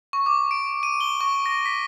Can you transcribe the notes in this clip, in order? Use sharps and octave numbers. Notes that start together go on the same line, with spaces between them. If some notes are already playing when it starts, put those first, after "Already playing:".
C#6
D6
D7
D#7
G7
C#6
A#6
B6